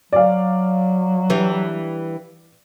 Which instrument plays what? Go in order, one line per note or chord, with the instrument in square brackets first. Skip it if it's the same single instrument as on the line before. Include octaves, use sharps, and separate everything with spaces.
[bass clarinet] F#3 [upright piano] D5 F5
[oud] E3 G3 D4